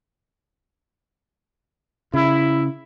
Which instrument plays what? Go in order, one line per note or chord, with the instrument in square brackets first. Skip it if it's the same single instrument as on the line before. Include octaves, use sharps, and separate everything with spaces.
[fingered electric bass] C#3 [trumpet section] E4